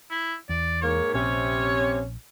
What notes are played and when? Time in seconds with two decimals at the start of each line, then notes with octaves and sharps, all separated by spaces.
0.11 E4
0.49 E2 D5
0.81 G#2 A#3 C#5
1.14 A#1 C3 C#4 C#5